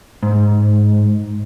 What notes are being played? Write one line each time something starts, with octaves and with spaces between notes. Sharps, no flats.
G#2